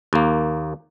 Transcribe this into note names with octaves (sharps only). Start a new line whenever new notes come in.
D#2 A#3